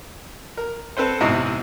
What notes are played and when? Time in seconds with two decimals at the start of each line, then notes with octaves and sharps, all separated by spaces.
0.57 A#4
0.97 C4 A4 B4 C5
1.21 A1 E2 G#2 C3 E4 D#5